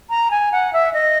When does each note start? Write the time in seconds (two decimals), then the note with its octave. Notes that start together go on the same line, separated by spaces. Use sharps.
0.10 A#5
0.31 G#5
0.52 F#5
0.73 E5
0.94 D#5